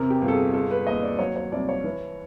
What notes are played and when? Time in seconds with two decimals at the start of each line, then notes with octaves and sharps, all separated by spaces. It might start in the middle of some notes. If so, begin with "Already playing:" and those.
Already playing: E2 C3 A#4
0.10 G4
0.22 G1
0.28 A4
0.33 G#4
0.53 G#3 A4
0.71 B4
0.87 D#2 D#5
1.03 D5
1.19 F#3 C#5
1.36 C#5
1.52 C2 D5
1.69 C#5
1.84 E3